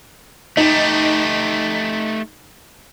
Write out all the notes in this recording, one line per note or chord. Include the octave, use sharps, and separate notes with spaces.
A3 D#4 G4